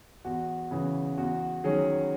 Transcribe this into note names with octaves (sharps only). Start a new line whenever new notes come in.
E2 F#4
C#3 E3 B3
E2 F#4
D#3 F#3 C#4 G#4